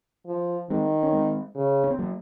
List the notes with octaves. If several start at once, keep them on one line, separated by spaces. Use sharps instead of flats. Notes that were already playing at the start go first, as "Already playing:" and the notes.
F3
D#3 G#3 C4
C#4
G#3 C4
C#3
C#4
C4
F#3 A#3